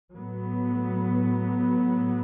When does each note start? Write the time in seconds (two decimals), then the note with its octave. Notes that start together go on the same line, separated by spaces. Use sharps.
0.15 A2 F#3 B3